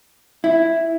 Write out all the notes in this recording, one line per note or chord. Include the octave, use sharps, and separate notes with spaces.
E4